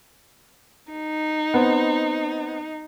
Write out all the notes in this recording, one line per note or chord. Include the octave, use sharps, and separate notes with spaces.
D#4
B3 C4